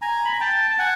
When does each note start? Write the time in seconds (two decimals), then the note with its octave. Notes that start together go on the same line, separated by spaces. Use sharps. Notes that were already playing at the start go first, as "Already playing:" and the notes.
0.02 G#5 A#5
0.25 B5
0.33 A#5
0.40 G5 A5
0.71 A5
0.78 F#5 G#5